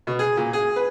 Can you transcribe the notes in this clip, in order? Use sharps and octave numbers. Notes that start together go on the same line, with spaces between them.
B2
G#4
A#2
G#4
B4